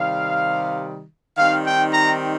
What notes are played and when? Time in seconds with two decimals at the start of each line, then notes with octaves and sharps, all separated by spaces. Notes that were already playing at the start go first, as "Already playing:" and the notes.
Already playing: C3 D#3 G3 F5
1.37 D#3 G3 C4 D#4 F5
1.65 G5
1.93 A#5